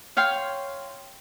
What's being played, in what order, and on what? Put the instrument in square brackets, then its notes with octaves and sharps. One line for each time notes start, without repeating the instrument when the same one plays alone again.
[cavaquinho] C#5 F5 G5 C6